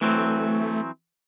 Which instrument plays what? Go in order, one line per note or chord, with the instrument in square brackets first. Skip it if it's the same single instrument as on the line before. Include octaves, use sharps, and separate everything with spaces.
[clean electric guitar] E3 F#3 C4 [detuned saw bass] A3